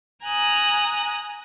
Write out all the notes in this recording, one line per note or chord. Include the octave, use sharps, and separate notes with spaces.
G#5 A#5 D#6 F#6